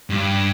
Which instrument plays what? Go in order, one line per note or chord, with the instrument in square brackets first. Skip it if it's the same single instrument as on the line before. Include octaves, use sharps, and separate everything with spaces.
[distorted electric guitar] G2